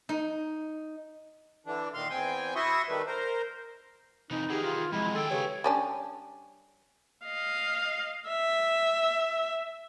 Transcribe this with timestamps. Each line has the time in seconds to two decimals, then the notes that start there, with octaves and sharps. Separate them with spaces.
0.09 D#4
1.66 D3 E3 D4
1.94 A#2 D#3 F5 C6
2.10 E2 C4 G5 G#5
2.56 E4 F#4 E5 C6 C#6 D#6
2.88 D#3 G3 A3 B4
3.07 A#4 C5
4.31 F2 C3 E3 D#4
4.50 D#3 E3 G4 G#4 F#5
4.64 F4
4.92 C3 F3 F#3 G#3 E4
5.15 D#3 G#4 A4 G5
5.31 C#3 G4 B4 C#5
5.64 G3 C#4 D4
7.26 D#5 F5
8.29 E5